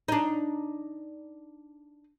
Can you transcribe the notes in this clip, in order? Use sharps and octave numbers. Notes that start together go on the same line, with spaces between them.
D4 D#4